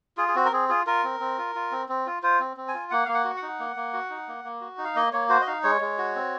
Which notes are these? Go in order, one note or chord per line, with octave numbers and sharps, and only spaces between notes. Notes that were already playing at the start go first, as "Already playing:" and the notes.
F4 G#4
G#4
C4 F#4
A#4
C4 G#4
F4 G#4
F4 A#4
C4
C4
F4
F4
C4
C4
F4
F4 C5
C4
C4
G#5
F4
A#3 F#5
A#3 F5
F#5
F#4
F#5
D#4
A#3
A#3
F#4
D#4
A#3
A#3
F#4
D#4
F5
A#3 D#5
A#3 C#5
F#4 C5
D#5
D#4 F5
G#3 C#5
G#3
F#4
C4